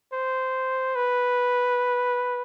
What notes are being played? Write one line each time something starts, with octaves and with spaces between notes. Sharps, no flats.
C5
B4